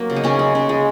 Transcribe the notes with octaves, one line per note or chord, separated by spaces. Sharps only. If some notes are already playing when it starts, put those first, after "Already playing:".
Already playing: F#3 A#3
C#3
D#4
C#3 C#4
G#3
C#3
G#3